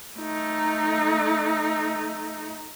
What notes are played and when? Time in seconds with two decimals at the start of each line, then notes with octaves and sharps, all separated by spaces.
0.18 A3 D#4